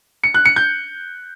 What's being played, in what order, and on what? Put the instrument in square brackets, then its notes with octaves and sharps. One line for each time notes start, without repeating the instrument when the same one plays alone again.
[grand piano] C#7
F#6
C#7
G6